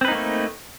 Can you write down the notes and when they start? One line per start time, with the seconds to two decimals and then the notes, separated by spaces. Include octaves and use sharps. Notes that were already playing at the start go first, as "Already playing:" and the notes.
0.01 C4
0.05 B4
0.08 D#4
0.12 A#3
0.15 A3